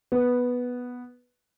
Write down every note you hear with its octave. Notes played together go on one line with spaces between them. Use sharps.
B3